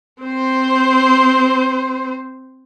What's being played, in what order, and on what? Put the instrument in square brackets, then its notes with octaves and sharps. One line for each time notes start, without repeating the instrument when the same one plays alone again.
[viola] C4 C5